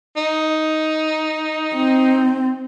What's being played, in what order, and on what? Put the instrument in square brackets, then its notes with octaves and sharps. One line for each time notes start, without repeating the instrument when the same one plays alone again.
[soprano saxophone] D#4
[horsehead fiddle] C4